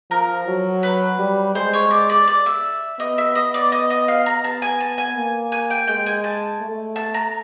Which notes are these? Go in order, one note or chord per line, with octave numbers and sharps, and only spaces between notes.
F3 A#4
F#3
B4
G3
G#3 C5
C#5
D5
D5
D5
E5
B3 D#5
E5
D#5
D5
D#5
D#5
F5
A#5
B3 A5
G#5
A5
G#5
A#3
G#5
G5
G#3 G5
G#5
A5
A3
A5
A#5